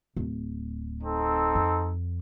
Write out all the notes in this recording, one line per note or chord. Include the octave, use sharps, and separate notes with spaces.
D1
C4 D#4 A4
F2